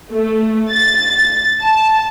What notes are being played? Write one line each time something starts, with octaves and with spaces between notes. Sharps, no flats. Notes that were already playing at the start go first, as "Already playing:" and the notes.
A3
A6
A5